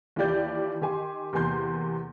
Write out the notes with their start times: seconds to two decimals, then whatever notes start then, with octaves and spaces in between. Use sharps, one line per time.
0.16 D#2 E3 F4 G4 D5 G6
0.81 D#3 G4 G#5 C6
1.33 E2 C3 A#3 G#5 C6 G6